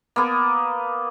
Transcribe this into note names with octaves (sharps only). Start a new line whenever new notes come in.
A#3 B3